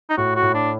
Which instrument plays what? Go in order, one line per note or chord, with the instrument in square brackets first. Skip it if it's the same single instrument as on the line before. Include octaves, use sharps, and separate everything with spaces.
[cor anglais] D#4
[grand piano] A2 [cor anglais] F#4
[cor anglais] F#4
[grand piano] A2
[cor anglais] D4